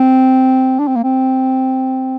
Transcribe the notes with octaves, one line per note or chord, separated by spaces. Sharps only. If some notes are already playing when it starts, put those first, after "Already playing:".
Already playing: C4
D4
C4
A#3
C4